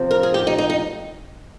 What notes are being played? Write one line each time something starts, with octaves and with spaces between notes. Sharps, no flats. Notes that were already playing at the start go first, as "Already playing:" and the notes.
Already playing: F2 C3 F3 C4
A#4
G#4
G4
D#4
D#4
D#4